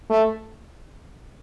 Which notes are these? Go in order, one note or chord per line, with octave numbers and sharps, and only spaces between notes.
A3